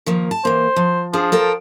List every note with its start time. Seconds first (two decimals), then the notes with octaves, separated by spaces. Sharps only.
0.06 D#3 F3 A#3
0.31 A5
0.45 E3 A#3 C5
0.76 F3
1.13 F3 D4 G#4
1.32 A4 A#4 G5